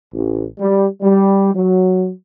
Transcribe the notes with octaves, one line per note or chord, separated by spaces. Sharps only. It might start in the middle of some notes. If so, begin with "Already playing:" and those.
A1
G3
G3
F#3